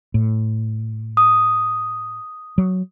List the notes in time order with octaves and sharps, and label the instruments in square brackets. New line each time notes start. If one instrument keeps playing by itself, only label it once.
[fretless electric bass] A2
[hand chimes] D#6
[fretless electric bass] F#3